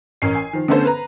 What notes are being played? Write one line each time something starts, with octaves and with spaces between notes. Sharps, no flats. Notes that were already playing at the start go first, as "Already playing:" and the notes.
A1 C#4 A#4 C7
G#5
D#3 F3
D3 A3 B3 C#4 A4 C5
B4 A#5